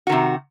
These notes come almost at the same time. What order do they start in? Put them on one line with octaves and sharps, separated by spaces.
F#4 D#3 C3